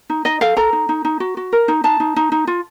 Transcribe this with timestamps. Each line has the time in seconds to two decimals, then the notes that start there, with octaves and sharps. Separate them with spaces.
0.10 D#4
0.25 D#4 D#5
0.41 A4 F5
0.57 A4 A#5
0.73 D#4
0.89 D#4
1.05 D#4
1.20 F#4
1.37 F#4
1.53 A#4
1.68 D#4
1.84 D#4 A5
2.00 D#4
2.16 D#4
2.32 D#4
2.47 F4